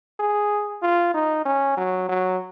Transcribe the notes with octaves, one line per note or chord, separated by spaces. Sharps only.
G#4
F4
D#4
C#4
F#3
F#3